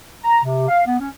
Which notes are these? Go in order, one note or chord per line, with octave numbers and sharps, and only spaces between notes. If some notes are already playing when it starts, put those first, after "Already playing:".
A#5
C3
F5
B3
C#4